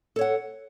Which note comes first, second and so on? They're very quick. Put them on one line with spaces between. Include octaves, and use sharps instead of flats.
A4 C#5 F#5